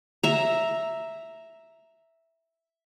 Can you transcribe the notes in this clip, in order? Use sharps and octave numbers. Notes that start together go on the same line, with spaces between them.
E5 A#5